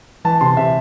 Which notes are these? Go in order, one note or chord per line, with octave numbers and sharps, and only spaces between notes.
E3 A5
C3 C6
C3 E5